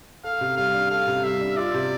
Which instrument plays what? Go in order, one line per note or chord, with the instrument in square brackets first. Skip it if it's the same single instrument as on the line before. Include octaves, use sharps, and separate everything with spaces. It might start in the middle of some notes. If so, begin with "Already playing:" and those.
[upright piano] A4 [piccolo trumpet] F5
[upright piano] C3
[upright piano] G3 [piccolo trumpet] F5
[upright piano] D4
[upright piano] A4 [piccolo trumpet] F5
[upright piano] C3
[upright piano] G3 [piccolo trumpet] E5
[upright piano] D4
[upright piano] F4 [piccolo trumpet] D5
[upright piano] C3